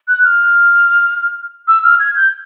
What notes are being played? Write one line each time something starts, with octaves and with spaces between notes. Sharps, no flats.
F#6
F6
E6
F6
G#6
G6